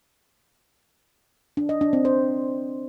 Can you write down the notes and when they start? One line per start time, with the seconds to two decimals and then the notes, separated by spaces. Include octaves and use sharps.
1.57 D4
1.69 D#5
1.81 D4
1.93 C4
2.05 C5